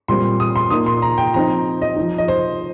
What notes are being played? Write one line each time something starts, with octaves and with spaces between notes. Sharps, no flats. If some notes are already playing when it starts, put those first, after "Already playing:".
A#2 G3 C4 C6
D#6
C6
A#2 A#3 D#4 D#6
C6
A#5
G5
F3 C4 D#4 A#5
D#5
F3 D#4
D#5
C5